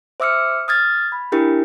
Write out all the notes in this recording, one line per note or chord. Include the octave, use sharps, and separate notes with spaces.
C5 E5 D6 E6 F6 C#7
D#6 F6 G#6 A6
B5
D4 E4 G4 A#4